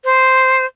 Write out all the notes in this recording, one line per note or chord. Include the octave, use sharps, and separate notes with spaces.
C5